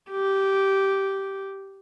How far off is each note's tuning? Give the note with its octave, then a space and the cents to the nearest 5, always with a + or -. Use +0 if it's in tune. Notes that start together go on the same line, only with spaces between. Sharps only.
G4 -10